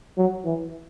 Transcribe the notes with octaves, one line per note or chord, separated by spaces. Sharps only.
F#3
E3